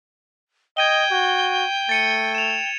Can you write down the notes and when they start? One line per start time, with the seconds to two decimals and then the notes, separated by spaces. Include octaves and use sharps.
0.77 D#5 G5 G#6 D#7 G7
1.11 F#4
1.89 A3 A6 C#7 D#7
2.35 E7 F7